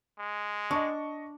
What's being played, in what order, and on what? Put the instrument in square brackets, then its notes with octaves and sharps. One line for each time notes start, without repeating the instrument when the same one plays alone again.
[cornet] G#3
[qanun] D4 [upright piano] D#5 C#6